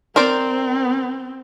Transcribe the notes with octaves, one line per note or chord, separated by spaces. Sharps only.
C4 A#4 C5 D5